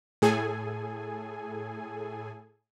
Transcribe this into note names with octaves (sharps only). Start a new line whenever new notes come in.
A2 G#4 A4 G#5